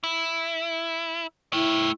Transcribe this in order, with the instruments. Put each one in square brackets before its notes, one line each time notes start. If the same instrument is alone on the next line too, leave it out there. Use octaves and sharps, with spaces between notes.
[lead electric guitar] E4
[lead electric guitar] A3 G5 [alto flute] E4